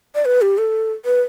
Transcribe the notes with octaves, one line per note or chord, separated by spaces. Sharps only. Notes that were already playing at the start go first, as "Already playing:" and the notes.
D5
B4
G4
A4
B4